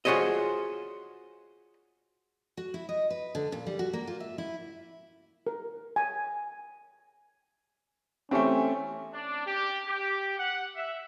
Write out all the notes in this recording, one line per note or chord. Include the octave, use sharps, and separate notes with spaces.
F4 F#4 G#4 C5 C#5 D#5
F#4
E4
D#5
B4
D3
A#2
G3
F#4
A#3
F4
E5
E4
A#4
G#5
E3 A3 C4 C#4 G4
D4
G4
G4
F#5
E5